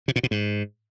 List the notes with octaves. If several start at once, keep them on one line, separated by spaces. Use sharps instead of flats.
C3
A#2
B2
G#2